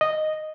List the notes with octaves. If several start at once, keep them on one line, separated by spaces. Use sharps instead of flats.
D#5